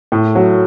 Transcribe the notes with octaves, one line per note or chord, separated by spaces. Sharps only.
A2
F#3